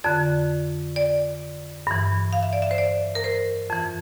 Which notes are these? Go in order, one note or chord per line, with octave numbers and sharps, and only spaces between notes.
F2 D3 D5
D5
G2 E3
F5
E5
D5
E5
C5
D5
A#4
C5
F2 E3